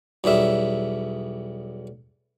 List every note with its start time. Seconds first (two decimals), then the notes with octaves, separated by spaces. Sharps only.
0.24 B1 E2 G3 E5